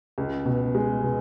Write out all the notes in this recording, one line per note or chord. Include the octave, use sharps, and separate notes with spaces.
C#2
B2
G#3
B2